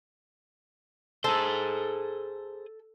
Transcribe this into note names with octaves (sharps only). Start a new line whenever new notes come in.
G#4 A4 C5